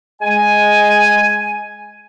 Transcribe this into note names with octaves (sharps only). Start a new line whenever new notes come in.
G#3 G#5